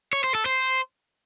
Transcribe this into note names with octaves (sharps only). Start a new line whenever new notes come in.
C#5
C5
A4
C5